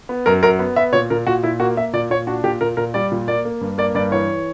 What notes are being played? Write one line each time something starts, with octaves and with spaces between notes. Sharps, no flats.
B3
F#2 A#4
F#2 A#4
B3
B3 E5
A#2 C#5
A#2 A#4
A#2 F#4
A#2 E4
A#3 F#4
A#3 E5
A#2 D5
A#2 C#5
D4 F#4
A#2 G4
A#2 A#4
A#2 A#4
G3 D5
A#2
A#3 D5
A#3
G2
A#3 D5
G2 D5
E3 C#5